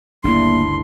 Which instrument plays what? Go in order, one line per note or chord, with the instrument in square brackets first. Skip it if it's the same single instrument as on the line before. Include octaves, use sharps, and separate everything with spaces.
[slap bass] G1 D2 C#3 [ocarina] A#3 [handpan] D4 E4 [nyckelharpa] C6